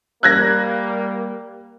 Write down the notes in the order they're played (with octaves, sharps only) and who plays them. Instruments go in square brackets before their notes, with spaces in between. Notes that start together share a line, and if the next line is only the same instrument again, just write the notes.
[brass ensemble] G3 A#3 [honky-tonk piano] F#6 G#6 A#6